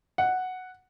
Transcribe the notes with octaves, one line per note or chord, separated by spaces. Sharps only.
F#5